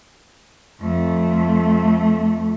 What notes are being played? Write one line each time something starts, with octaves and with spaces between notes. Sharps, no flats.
F2 A3